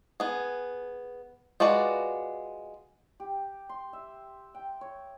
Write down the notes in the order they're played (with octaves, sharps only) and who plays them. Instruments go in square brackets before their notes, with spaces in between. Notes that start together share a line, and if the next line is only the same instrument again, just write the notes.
[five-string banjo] B3 G#4
G#3 F4 F#4 B4 D5
[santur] G4
C6
E5
G5
C#5